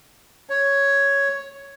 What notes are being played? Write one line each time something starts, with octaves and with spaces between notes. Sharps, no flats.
C#5